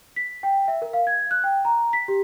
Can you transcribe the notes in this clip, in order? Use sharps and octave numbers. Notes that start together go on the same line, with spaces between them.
B6
G5
E5
A#4
F5
G#6
F#6
G5
A#5
B6
G4